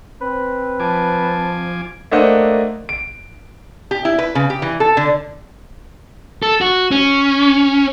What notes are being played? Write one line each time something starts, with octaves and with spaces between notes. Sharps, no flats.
C4 B4
F3 G#5 A5 D6
A3 A#3 D4 C5 D#5 F#5
D7
G4
E4
B4
C#3
G4
E3
A4
D3
A4
F#4
C#4